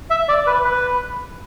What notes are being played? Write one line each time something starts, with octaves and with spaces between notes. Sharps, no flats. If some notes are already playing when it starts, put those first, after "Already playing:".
E5
D5
B4
B4